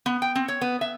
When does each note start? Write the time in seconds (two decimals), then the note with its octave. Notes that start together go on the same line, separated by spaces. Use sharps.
0.06 B3
0.22 G5
0.36 C4
0.48 C#5
0.61 B3
0.81 E5